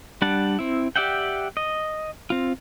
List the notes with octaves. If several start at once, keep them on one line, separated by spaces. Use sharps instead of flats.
G3 D4 F#5 A5
C4 E4
G4 D5 E5 F#5 G5
D#5
C4 F4